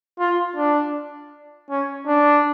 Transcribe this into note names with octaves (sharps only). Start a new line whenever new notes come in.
F4
D4
C#4
D4